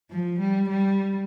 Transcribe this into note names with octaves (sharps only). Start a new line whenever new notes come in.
F3
G3
G3